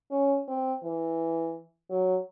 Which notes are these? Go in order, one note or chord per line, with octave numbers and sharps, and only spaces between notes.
C#4
C4
E3
F#3